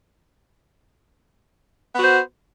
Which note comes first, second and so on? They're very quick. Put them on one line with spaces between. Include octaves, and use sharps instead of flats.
B3 F#4 C5